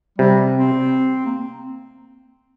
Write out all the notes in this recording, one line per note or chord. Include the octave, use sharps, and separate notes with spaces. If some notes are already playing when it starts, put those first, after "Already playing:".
C3 G3
C4
A#3